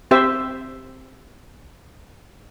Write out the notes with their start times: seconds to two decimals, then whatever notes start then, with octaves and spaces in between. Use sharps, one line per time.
0.11 C4 G4 C5 E5